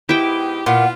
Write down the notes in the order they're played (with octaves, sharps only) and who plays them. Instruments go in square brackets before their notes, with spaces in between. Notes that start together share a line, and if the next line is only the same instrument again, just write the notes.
[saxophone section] G#2 B3 G4 [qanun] E4 G5
[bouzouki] A#2 [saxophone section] B3 F4 [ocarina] F#5